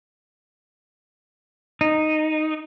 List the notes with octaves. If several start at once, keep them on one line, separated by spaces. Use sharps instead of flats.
D#4